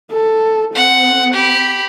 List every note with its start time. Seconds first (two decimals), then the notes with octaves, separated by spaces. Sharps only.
0.11 A4
0.75 C4 F#5
1.34 G4 B5